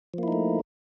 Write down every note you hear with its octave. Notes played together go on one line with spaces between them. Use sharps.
F3 A3 A#3 D#4 E4